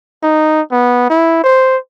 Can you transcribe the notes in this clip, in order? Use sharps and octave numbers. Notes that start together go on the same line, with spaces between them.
D#4
B3
E4
C5